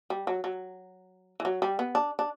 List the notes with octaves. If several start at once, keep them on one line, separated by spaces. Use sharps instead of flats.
G3
F#3
F#3
E3
F#3
G3
B3
D4
D4